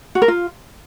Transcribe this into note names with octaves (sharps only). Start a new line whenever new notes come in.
F#4
A#4
F4